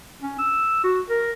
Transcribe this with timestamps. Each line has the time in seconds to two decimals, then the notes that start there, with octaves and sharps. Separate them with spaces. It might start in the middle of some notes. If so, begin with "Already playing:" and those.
0.22 C#4
0.38 E6
0.84 F#4
1.10 A#4